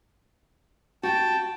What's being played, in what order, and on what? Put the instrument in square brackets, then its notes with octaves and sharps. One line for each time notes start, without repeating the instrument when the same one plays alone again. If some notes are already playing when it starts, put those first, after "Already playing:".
[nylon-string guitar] F#4 [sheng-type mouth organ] G5 A5